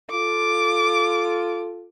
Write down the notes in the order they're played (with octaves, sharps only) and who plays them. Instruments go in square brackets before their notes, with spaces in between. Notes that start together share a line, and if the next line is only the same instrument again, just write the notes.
[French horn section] F4 A4 [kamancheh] D6